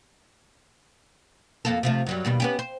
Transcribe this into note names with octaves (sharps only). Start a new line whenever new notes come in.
F2 A#3 A4
C3 F3 A3
F#2 F#3 G3
D#2 B2 G3
B3 C#4 G4
C5